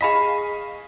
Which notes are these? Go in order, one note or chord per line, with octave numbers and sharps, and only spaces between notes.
G#4 D#5 F5 G#5 B5 B6